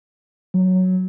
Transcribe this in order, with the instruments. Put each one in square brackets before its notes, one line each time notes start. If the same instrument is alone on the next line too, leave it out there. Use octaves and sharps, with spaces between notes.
[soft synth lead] F#3